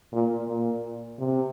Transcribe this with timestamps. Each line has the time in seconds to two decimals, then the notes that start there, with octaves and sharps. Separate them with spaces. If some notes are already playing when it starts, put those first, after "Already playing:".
0.12 A#2
0.48 A#2
1.19 C3